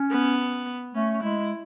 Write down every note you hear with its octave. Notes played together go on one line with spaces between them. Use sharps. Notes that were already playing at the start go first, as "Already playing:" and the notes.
Already playing: C#4
B3
A3 C#4
G#3 E4